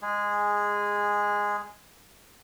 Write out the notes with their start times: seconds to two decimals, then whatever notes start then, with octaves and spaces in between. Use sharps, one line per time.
0.02 G#3 G#4